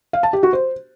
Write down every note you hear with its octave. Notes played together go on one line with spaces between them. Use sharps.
F5
A5
G4
F#4
C5